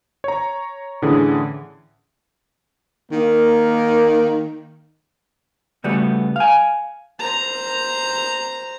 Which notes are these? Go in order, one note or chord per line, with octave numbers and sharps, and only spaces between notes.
C#5 A#5
A2 D3 E3 C#4 G#4
D#3 A#3
C#3 G3 A3 B3 F#4
F5 G#5
C5 A#5